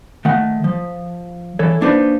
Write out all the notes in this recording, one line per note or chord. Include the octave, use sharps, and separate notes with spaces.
D#3 A3 F#5
F3
E3 A4 C#5
A#3 D4 D#4 G#4 B4 C5